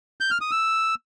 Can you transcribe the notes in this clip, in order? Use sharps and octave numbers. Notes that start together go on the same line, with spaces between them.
G6
F6
D#6
E6